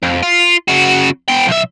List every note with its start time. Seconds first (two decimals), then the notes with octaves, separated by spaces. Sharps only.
0.03 F2
0.23 F4
0.68 C#3 F#4
1.29 B3 G5
1.48 B1 E5